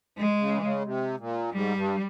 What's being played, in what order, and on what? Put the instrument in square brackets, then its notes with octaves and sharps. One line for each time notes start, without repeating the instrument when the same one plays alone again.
[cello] G#3
[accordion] C#3
E3
C#3
C3
A#2
[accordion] G#2 [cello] G3
[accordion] G2